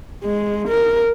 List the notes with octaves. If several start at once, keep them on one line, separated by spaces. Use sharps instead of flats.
G#3
A#4